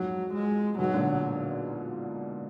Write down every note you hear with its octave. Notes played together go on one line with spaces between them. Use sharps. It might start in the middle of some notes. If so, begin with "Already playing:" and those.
Already playing: F2 G#2 F#3
G#3
G#2 B2 F#3
A#2 D3